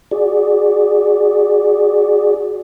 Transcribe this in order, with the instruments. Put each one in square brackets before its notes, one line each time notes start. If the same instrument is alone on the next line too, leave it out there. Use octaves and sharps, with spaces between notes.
[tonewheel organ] F#4 G#4 D5